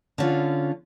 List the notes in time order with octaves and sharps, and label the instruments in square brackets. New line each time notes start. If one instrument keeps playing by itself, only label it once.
[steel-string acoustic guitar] D3 C#4 F4